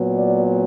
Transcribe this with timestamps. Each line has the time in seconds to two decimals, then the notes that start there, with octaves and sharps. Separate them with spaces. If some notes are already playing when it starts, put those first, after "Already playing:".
Already playing: A#2 F#3 B3
0.13 D5